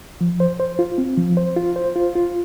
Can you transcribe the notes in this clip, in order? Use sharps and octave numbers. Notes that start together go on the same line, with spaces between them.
F3
C5
C5
F4
C4
F3
C5
F4
C5
F4
F4